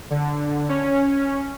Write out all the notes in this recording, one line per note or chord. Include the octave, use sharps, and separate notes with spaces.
D3
C#4